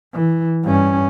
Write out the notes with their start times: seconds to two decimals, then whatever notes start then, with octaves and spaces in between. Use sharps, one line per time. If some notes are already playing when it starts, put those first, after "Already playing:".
0.13 E3
0.64 G2 C#4